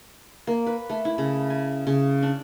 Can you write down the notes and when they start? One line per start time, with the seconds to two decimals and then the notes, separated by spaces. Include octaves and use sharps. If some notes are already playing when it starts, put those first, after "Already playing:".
0.47 A#3
0.67 B4
0.90 A3
1.05 E4
1.18 C#3
1.50 G#5
1.87 C#3
2.22 D4